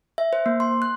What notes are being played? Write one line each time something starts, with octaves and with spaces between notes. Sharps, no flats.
E5
C5
A#3
C6
F#6